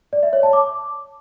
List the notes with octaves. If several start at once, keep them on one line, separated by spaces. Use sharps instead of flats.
D5
E5
C#5
A5
D6